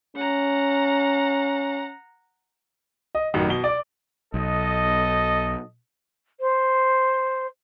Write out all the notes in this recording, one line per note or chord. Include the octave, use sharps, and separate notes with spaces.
C#4 F#5 A#5
D#5
A1 F#2 D#3
B2 G7
D5 D6
B1 A4 D#5
C5